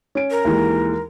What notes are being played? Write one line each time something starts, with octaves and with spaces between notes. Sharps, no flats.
C#4 D7
A#4
D#2 E3 G#3